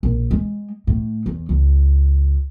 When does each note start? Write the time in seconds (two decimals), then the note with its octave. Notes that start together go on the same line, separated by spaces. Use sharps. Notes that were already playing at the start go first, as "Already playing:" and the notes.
0.03 A#1
0.31 G#3
0.87 A2
1.26 E2
1.49 C#2